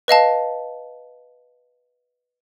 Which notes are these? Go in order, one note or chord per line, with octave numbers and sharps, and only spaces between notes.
B4 D#5 F5 A5